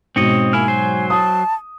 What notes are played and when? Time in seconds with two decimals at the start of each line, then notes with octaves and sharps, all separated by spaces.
0.16 G#2 B2 C4 C#5 D#5
0.53 A#3 E4 G#5 F6
0.68 F#3 C5
1.10 A5 D#6